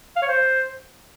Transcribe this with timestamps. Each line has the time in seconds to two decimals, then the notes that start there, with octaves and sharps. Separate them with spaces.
0.16 F5
0.22 C#5
0.28 C5